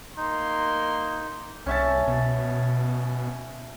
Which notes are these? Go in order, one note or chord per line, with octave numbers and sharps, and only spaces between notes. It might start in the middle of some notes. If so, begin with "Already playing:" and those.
A#3 D#4 C6
C2 C#4 E5 A5
B2